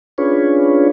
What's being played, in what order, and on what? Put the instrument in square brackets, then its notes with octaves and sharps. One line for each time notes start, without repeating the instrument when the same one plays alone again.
[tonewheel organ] C#4 D4 F4 G#4 B4 C#5